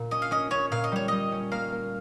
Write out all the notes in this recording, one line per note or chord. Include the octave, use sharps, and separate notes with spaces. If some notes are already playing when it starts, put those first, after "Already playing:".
Already playing: A#2
C#4 D#5
F5
C#4 D#5
C#4 C#5
A#2 F5
D#5
G3 C#5
G3 D#5
C#4
A#3 F5
A#3